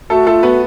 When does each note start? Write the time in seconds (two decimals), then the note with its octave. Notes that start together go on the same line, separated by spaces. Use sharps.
0.10 A3 F#4 A4
0.27 A3 F4 A4
0.43 B3 F#4 B4